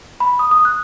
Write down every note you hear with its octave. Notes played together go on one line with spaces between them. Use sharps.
B5
D#6
D#6
F#6